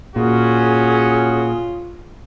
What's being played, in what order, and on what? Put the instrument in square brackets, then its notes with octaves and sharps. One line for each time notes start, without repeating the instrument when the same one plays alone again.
[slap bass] A#2 [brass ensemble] C#4 F#4 [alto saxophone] F4 [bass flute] G#4